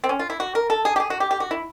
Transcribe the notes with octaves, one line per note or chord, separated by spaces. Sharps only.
C4
C#4
F4
E4
F#4
A#4
A4
G#4
G4
G#4
F#4
G4
G4
F#4
E4